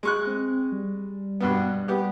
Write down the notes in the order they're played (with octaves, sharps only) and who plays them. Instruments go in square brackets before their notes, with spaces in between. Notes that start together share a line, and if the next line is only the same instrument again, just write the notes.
[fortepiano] G#3 C#6 F#6
[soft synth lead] C4
G3
[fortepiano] G2 B2 B3
B3 G4